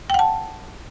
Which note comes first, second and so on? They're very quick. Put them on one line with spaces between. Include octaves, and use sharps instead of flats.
G5 F#5 A5